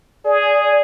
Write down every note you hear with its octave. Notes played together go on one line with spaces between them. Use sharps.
G#4 D5